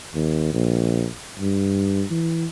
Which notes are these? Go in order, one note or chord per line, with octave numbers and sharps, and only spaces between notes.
D#2
A#1
G2
E3